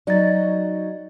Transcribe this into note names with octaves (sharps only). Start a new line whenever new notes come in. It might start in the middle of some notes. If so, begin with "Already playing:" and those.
F#3 D#4 F#4 D5 A6